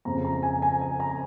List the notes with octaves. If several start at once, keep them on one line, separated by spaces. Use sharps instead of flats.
F2 C#3 F3 A#5
A#5
G#5
G#5
G#5
A#5